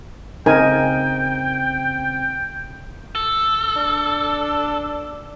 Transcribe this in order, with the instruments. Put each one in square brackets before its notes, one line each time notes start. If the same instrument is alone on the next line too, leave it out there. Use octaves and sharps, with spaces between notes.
[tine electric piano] C#3 C4 [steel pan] D#4 A#4 G#5 [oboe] G5
[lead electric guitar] A4
[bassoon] D4